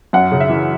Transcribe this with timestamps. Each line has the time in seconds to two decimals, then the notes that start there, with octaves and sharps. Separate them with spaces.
0.13 F#2 F#5
0.32 C#3
0.40 E5
0.49 E3